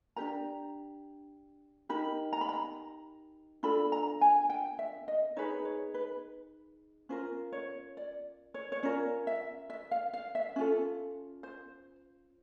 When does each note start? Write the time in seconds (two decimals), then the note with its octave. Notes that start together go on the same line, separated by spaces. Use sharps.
0.16 D4 G4 A#4 A#5
1.89 D#4 G4 A#4 B5
2.33 A#5
2.41 B5
2.49 A#5
3.63 D4 F4 A4 B5
3.92 A#5
4.21 G#5
4.50 G5
4.79 E5
5.08 D#5
5.37 D#4 G#4 B4 C#5
5.65 C#5
5.94 B4
7.09 C#4 F4 A#4 C5
7.53 C#5
7.97 D5
8.54 C#5
8.72 C#5
8.83 C#4 F4 A#4 D5
9.27 E5
9.70 E5
9.91 F5
10.13 F5
10.35 E5
10.56 C#4 F4 A4
11.43 C5